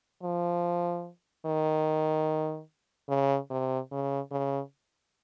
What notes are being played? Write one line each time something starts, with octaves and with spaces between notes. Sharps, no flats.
F3
D#3
C#3
C3
C#3
C#3